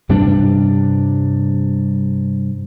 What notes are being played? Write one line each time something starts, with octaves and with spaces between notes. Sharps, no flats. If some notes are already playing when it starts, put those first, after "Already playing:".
G2 C3 G3 D4